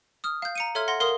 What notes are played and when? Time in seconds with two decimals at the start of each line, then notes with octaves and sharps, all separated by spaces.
0.24 D#6 F6
0.42 F5 G6
0.55 A#5 C#7 D#7
0.75 A4 C#5 E5 C6 F6 G#6
0.88 F#5 C6 A#6
1.00 A#4 F5 C6 D#6 F6